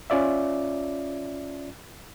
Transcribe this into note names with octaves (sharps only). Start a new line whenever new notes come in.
C#4 F4 D5 E5